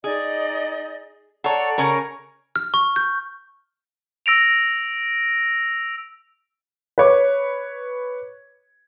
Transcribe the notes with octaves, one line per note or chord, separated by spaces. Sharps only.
D#4 G#4 D5 D#5
A4 C#5 D5 F#5 A5 A#5
C#3 C#4 A#4 G#5 G#6
F6
C#6
G6
E6 A#6 D7 F7
B4 C#5 D6